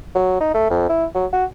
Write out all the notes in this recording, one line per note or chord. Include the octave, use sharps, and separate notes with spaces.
F#3
D#4
A3
F2
E4
F#3
F#4